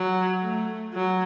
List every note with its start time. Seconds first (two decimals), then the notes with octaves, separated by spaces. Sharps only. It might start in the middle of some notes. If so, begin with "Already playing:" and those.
Already playing: F#3
0.42 A3
0.94 F#3